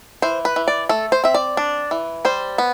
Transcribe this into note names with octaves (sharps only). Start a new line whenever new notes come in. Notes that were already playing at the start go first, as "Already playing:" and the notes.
E3 C5
B4
E3
D5
A3 A4
C5
C4 E5
D5
D4
E3
G3 C5
B3